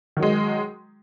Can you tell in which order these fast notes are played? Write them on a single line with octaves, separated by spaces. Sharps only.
D#3 F#3 G#3